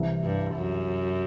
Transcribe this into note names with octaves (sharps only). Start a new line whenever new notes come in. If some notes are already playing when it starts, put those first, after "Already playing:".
Already playing: C2 C3 E3
G2
F#2